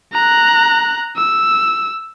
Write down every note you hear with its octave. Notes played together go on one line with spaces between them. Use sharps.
A#5 F#6
E6